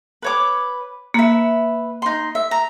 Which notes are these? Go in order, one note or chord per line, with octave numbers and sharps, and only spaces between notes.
B4 C#5 D6
A#3 B4 E5
D#4 C6
E5
A#5